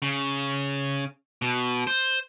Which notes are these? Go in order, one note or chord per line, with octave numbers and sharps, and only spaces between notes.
C#3
B2
C5